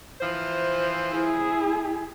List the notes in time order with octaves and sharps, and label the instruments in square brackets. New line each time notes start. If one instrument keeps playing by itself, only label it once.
[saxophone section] E3 F3 C5
[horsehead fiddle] E4 G#4